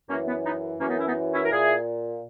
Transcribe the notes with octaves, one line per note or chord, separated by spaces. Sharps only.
F#2 E3 A#3 C#4
B3
B3 D#4
F#2 E3 A#3 C#4
B3 D#4
C#4 E4
B3 D#4
C#4 E4
A#4
A#2 E4 G#4